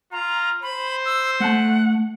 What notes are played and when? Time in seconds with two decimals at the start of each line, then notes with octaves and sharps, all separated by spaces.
0.12 F4 A#5
0.63 C5 B5
1.05 E6
1.40 A3 F#5 A5